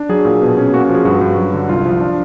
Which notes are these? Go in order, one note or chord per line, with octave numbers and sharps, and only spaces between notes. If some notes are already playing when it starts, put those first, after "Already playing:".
Already playing: D4
F#3 G#4
A#2
B2
C#4
A#3 F#4
F#4
F3
G#4
G2 F#4
G2
F#3
D3
C2 F4
F3
D4